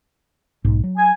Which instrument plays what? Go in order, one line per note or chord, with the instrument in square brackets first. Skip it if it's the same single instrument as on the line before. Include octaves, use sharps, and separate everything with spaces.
[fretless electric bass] B1 G#2
F#3
[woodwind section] G#5